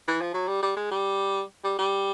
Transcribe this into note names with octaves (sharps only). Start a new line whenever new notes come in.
E3
F3
F#3
G3
G3
G#3
G3
G3
G3